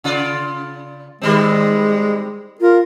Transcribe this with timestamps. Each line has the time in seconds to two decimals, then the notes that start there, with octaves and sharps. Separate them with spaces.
0.04 C#3 F4 D5
1.22 D#3 G3 G#3 C4
2.61 F4 A#4